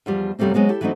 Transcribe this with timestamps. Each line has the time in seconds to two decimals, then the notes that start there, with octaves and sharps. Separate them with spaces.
0.06 E2 F3 G3
0.39 F#2 C3 G3 A3 A#3 C4
0.54 F#3 G#3 B3 C4
0.69 E4 G4 A4
0.81 E3 F#3 A3 C4 D#4